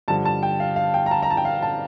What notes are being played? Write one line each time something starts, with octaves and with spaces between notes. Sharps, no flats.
G2 D3 F3 A5
A5
G5
F5
F5
G5
A#5
A5
A#5
A5
G5
F5
A5